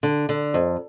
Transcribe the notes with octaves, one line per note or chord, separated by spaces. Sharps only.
D3
D3
F2